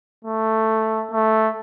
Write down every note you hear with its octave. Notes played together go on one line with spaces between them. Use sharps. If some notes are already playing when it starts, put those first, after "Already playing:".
A3
A3